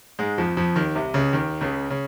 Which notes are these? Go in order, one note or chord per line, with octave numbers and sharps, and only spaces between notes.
G#2 G#3
F2 F3
F2 F3
D#2 D#3
C2 C3
C#2 C#3
D#2 D#3
C#2 C#3
C#3